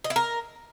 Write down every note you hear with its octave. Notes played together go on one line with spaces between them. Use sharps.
D#5
E4
A#4